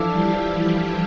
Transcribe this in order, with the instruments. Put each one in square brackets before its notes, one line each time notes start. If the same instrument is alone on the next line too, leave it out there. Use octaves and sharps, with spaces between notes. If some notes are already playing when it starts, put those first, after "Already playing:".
Already playing: [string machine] E3 F3 E4 F4 [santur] D4 A4 D5
[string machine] G3 G4